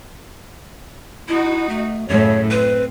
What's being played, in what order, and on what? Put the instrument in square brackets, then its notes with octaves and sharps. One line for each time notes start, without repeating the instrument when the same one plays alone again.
[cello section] D#4 F#4 [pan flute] E4
[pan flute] A3
[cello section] F#2 A2 C#3 [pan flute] C#5
[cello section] C4 [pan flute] B4